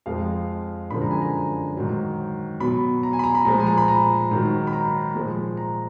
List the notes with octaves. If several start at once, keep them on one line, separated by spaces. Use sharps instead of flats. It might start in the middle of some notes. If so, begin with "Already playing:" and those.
F2 F3 G#3 F5
F#2 D3 F3 G#3 B5
A#5
G#5
A#5
G#2 D#3 F#3
B2 F#3 B5
A#5
G#5
B5
A#5
B5
A#2 F3 G#3 A#5
G#5
A#5
B5
A#5
G#2 D#3 F#3
B5
A#5
A#2 F3 G#3
A#5